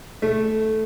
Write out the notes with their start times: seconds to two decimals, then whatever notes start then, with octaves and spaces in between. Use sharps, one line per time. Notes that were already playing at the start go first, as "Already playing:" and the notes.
0.22 A3